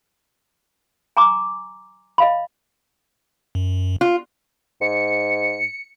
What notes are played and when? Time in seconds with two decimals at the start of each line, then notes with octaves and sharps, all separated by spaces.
1.17 G#5 A#5 C6 D6
2.18 D#5 F5 B5
3.55 F#2
4.01 F4
4.81 G#2 C#7